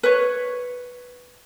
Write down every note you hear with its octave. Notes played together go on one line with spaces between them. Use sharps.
B4 C#5